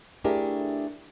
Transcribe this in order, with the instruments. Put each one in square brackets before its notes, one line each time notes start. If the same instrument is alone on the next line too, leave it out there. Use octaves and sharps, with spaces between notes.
[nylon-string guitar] A3 D4 E4 G4 G#4 A#4